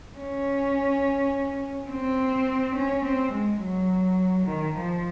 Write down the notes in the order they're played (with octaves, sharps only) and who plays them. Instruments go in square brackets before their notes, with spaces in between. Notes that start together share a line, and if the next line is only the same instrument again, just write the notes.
[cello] C#4
C4
C#4
C4
G#3
F#3
D#3
F3